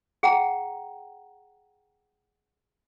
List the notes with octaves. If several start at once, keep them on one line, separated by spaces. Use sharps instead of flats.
G#4 F#5 G5 A#5